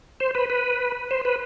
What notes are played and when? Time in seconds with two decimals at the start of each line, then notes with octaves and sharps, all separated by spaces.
0.20 C5
0.35 B4
0.50 B4
1.11 C5
1.25 B4